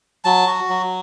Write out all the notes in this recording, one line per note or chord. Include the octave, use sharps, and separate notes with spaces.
F#3 A5
F#4
F#3